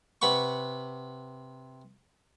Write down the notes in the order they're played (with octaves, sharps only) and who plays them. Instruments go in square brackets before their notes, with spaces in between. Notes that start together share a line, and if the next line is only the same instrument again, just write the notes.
[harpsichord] C3 B4 F#5 C#6